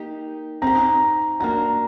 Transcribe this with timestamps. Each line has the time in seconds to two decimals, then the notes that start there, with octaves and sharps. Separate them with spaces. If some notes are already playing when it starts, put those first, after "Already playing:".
Already playing: A#3 D#4 G4
0.62 C4 D#4 G4 A#5
1.40 A#3 D4 F#4 A#5